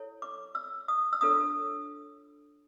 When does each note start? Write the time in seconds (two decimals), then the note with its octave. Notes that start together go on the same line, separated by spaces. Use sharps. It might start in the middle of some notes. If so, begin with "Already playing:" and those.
Already playing: E4 A4 C#5
0.22 D6
0.55 E6
0.88 D#6
1.13 E6
1.21 D4 F4 A4 C#5 D#6